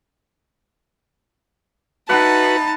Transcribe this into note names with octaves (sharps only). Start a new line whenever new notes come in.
D#4 F#4 B4 E5 F#5 A5 B5